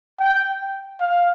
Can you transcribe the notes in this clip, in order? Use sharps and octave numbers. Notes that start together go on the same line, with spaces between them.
G5
F5